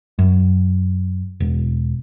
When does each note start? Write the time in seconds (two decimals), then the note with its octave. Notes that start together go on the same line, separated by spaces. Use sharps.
0.19 F#2
1.40 E1